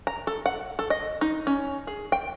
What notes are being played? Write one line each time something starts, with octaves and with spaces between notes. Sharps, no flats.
A#5
A4
F#5
A4
D#5
D#4
C#4
G#4
G5